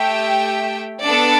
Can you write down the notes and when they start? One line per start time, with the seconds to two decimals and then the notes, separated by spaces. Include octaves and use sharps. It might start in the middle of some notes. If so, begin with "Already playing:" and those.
Already playing: A3 G4 E5 G5
1.02 B3 D4 A4 D5